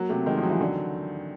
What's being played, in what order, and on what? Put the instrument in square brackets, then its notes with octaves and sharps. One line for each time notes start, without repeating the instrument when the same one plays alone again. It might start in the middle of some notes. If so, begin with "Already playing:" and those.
Already playing: [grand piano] F#3 [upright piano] A#3
[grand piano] C3 [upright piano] A3
[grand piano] D#3 [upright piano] G#3
[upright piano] F3
[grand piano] F#3
[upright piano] E3
D3